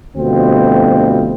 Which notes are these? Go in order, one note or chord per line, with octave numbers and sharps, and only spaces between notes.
D2 B2 D3 F3 G3 C4